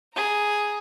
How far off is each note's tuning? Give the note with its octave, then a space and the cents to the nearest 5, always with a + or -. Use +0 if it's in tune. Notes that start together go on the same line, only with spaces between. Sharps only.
G#4 +0 A#5 +0